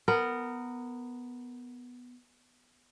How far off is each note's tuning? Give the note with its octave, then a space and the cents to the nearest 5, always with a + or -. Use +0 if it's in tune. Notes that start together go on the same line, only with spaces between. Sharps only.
B3 +0 A#4 -15